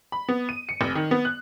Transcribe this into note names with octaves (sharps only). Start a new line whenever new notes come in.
B5
B3
D#7
C#7
F1
D#3
B3
F#6